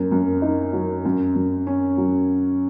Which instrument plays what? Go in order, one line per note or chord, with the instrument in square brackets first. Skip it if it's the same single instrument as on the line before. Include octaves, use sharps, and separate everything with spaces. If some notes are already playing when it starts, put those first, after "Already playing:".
Already playing: [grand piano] F#2 A#3
F#2
D#4
F#3
F#2
F#2
C#4
F#3